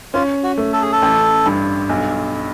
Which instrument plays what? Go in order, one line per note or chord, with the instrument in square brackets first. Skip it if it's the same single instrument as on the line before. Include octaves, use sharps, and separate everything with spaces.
[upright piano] C#4 [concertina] F4
[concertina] F#4
[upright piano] A3
[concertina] A4
G#4
A4
[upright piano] A1
G2
B1